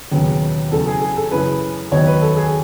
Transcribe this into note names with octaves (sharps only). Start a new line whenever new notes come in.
E1 D#2 C#3 F#3 B3
E2 C#3 F#3 A4
G#4
G#4
A4
F#2 C#3 E3 B4
D#2 D#3 F#3 B3 D#4 C#5
B4
A4
G#4